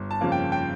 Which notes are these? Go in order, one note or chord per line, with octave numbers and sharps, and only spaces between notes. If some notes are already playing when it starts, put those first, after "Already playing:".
Already playing: G1
A5
F2 C#3 F3 A#3
G5
G5